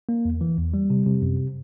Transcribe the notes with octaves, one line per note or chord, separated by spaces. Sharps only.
A#3
E2
E3
E2
G3
C3
C3
F#2